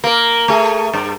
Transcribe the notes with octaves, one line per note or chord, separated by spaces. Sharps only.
A#3 A#4
A3 G#4
G2